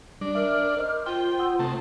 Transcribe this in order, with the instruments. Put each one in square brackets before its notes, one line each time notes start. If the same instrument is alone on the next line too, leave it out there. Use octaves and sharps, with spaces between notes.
[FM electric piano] G3 [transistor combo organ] D4
[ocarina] A#4 [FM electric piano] E5 [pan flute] F6
[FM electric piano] A#4 D#5 D6 [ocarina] C5
[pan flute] F4 [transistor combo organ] G5 [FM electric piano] C6
[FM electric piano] F#5 D#6 E6
[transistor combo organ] C3 A3 [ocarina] C5